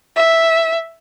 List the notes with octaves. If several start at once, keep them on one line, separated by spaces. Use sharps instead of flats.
E5